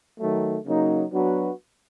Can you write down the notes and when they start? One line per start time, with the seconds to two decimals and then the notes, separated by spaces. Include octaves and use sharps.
0.20 D#3 F#3 A3
0.66 C#3 F#3 A#3 D#4
1.13 F#3 B3 D4 F#4 B4